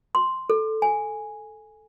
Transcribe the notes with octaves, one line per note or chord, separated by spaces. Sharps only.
C6
A4
G#5